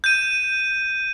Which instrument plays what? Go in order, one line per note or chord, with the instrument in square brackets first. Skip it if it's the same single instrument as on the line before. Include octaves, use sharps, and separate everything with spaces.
[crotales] G6 D#7